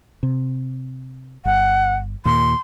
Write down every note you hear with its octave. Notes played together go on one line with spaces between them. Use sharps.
C3
G1 F#5
D#2 A#2 C6